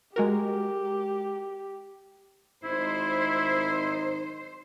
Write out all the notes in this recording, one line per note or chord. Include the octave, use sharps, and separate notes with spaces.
G#3 F#4 G4 A#4
G#1 D#4 E4 C5